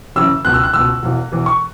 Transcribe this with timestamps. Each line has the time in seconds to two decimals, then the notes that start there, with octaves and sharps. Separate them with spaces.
0.16 F#1 F#2 C#3 E3 E6
0.45 C#2 B2 F#6
0.54 E6
0.64 F#6
0.74 C#2 B2 E6
1.03 E1 E2 E3
1.32 E1 E2 E3
1.46 C#6